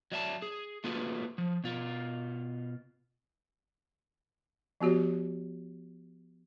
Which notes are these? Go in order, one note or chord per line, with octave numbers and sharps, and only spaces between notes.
F#3 D5 E5 F5 A5
G#4
A3 A#3 F4 F#4 G#4 B4
F3
B2 F4
F3 B3 F#4 G4 C#5